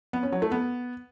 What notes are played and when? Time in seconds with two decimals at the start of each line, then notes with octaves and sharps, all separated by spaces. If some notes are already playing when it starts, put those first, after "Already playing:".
0.13 B3
0.23 C#4
0.32 F#3
0.42 A3
0.52 B3